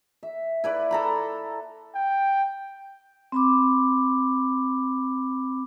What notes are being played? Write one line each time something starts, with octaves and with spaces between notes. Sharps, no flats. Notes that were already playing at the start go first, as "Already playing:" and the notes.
E5
E4 B4 D5
A4 A#5 B5
G5
C4 B5 D6